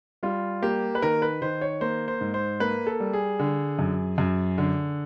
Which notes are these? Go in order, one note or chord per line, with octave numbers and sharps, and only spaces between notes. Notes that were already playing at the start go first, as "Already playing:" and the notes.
G3 F4
A#3 G4
B4
D#3 A#4
B4
D#3 C5
C#5
A#3 C5
C5
G#2
C5
A#3 B4
A4
G3
G#4
D3
F#2
F#2
D3